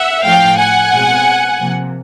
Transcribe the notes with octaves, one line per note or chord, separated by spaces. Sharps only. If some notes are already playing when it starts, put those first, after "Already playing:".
Already playing: E5 F#5
A2 F3 A3 F5 G5
F#5 G#5
B2 G#3 C4
C3 F3 A#3